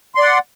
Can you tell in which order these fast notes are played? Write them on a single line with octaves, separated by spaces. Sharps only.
C6 D5 F#5